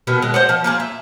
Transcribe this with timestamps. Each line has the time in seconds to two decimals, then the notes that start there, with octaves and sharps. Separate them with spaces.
0.07 B2 D#3 B3
0.22 G#3
0.34 C5 D#5 F#5
0.49 F3
0.64 A#3 F4 G#4
0.80 E5